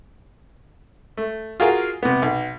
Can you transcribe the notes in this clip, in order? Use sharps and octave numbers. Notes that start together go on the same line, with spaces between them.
A3
F4 F#4 G#4 A#4 F5
C3 B3
B1